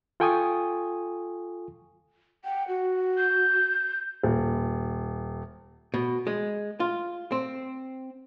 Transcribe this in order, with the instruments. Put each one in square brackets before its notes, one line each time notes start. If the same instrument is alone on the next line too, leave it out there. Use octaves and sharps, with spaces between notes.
[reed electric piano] F4 A4 G5 G#5 C#6 D#6
[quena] F#5 [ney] G5
[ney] F#4
[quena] G6
[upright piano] D#1
[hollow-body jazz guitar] B2
G#3
F4
C4